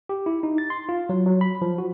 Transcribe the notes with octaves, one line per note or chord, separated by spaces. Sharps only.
G4
E4
D#4
A6
C6
F4
F#3
F#3
B5
F3
F#4